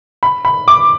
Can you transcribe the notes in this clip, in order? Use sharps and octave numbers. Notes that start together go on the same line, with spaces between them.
B5
B5
D6